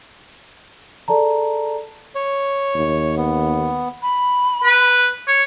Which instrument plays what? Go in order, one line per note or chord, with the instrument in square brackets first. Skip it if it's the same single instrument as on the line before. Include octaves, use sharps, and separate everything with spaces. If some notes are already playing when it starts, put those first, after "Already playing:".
[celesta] G#4 A4 D5 A5 A#5
[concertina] C#5
[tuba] D#2
[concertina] B3
[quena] B5
[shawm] B4
C#5